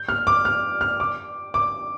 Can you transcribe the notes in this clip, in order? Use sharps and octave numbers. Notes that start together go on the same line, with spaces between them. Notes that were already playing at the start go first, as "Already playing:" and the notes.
Already playing: G6
F6
D6
F6
F6
D6
D6